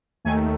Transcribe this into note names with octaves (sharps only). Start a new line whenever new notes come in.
D#2 D#3 A3 G#5